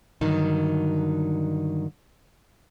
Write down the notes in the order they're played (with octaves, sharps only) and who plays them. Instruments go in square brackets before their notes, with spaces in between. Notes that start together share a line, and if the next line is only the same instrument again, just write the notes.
[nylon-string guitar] G2 D3 D#3 F#3 D#4